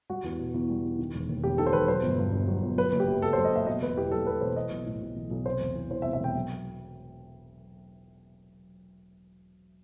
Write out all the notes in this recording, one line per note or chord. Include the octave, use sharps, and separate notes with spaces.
G3 F#4
E2
B2
E2
G3
E2
D#3
E1
D#2
E1 G4
D#3 A4
C5
E1 B4
F#3 C5
G1
G2
G1
F#3
G1
F#3 B4
F#1
G4
F#2
F#1 A4
C5
F#3
D#5
F#1 E5
B2 D#5
E1 B4
E2 G4
F#3 A4
B2 B4
E1 C5
E3 D#5
B1
A2
B1
E3
B1
C3 C5
E1
E2
E3 C5
E5
C3
E5
E1 G5
F#3